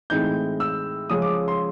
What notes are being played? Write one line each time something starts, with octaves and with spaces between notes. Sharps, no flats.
A2 E3 G#3 C4 D#4 G6
E6
C#3 F3 G#3 C#4 D#6
D6
C6